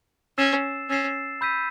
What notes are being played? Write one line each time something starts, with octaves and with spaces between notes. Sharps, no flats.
C#4 E6 A6 C7 E7
C#4 E6 A6 C7 E7
B5 E6 G6 B6 D#7